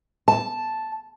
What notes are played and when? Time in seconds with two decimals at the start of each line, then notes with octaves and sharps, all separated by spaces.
0.28 A5